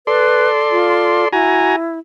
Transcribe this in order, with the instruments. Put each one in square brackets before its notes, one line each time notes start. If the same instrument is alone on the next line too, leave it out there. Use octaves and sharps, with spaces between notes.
[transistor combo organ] A4 D5 C6 [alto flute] B4
[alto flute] F4
[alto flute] E4 [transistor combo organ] F#4 G#5 A#5